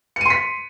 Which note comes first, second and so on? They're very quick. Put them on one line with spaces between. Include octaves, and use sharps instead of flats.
C#7 D#7 C6 B6